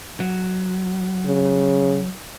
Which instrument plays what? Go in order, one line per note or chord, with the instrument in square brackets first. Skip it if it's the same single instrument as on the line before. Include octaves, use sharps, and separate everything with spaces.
[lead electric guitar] F#3
[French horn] C#3